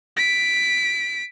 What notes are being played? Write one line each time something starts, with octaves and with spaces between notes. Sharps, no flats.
B6 D7